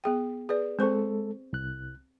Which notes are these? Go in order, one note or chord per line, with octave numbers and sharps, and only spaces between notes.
B3 G#4 G5
G#4 B4 D5
G#3 C4 A4 C5 C#6
C2 F#6